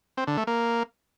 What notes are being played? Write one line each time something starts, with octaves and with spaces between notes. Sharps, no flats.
C4
D3
A3
A#3